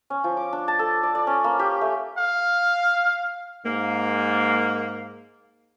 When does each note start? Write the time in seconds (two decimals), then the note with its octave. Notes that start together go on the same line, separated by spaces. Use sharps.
0.10 C#4
0.24 F3
0.37 D6
0.53 D4
0.68 A5
0.79 A4
1.03 D5
1.15 D5
1.27 C#4
1.44 A#3
1.59 G4
1.81 A3
2.18 F5
3.65 G#2 A#3